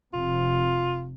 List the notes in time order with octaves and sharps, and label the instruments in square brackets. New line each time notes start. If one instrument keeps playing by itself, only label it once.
[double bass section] F1 C3 [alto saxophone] F4